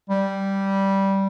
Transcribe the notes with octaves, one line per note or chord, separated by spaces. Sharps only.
G3